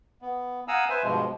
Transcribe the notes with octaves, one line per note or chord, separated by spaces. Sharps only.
B3
F5 F#5 G#5 A#5 D#6 E6
B4 C5 E5 G#5
G2 B2 F3 G#3